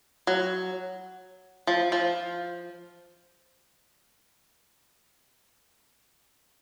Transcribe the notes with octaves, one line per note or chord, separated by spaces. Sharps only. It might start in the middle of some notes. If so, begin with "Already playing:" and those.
F#3
F3
F3